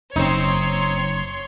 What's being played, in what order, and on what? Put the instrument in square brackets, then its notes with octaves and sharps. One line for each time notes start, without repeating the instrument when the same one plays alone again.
[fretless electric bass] F#1 [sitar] C4 D#4 [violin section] C#5 C6